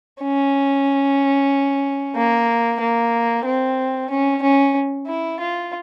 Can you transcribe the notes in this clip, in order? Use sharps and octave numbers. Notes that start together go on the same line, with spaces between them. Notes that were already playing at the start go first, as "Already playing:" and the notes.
C#4
A#3
A#3
C4
C#4
C#4
E4
F4